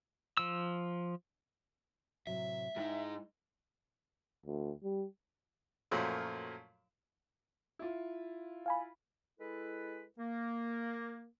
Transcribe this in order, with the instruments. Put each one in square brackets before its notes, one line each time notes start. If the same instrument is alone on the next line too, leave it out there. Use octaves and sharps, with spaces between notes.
[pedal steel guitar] F3 E6
[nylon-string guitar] A2 C3 F#3 [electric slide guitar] E5
[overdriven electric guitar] G#2 D#4 [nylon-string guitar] G#3 E4 G5
[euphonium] D2
G3
[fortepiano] F#2 A#2 F3 F#3 A3
[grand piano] E4 F4
[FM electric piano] F5 G#5 B5
[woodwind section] G#3 E4 A4 B4
A#3